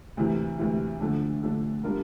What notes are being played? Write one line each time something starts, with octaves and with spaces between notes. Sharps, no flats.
D2 C3 E3
D2 C3 E3
D3 F3 A3 D4
D3 F3 A3 D4
G3 D4 F4 A#4